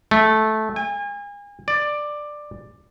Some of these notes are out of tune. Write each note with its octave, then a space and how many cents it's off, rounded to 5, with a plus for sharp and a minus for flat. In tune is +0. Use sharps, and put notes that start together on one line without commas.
A3 -15
G#5 -35
D5 +10